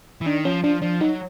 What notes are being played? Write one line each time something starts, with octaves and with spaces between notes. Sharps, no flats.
E3
D#3 D4
F3 C#4
F3 D4
F3 D4
F#3 D#4